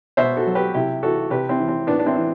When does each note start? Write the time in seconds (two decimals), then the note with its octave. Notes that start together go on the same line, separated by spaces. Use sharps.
0.17 B2 C5 E5
0.37 F#4 A4
0.46 F#3
0.55 G4 B4
0.74 C3 E4 G4
1.03 E3 F#4 A4
1.30 C3 G4 B4
1.49 C4 E4
1.59 E3
1.68 C4
1.87 A2 B3 D4
1.99 D4
2.06 C4 E4
2.16 E3